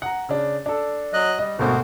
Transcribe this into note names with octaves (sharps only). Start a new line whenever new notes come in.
F#5 A#5
C#3 D4
D4 A4
F#3 D#5 F#6
G3 D#5
G#1 D2 B2 F#4 A#4 C5